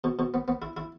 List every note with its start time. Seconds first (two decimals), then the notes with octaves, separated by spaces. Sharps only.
0.04 B2
0.19 B2
0.34 B3
0.48 B3
0.62 E4
0.77 E4